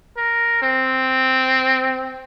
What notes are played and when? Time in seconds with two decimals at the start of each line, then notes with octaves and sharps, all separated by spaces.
0.17 A#4
0.62 C4